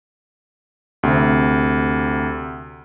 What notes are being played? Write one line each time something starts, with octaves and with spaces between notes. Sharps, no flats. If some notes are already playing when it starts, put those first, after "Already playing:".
D2 C3